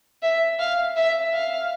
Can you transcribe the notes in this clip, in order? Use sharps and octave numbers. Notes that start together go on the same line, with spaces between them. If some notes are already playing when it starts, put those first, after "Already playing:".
E5
F5
E5
F5